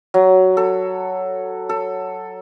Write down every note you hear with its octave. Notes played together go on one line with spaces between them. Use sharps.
F#3
A4
A4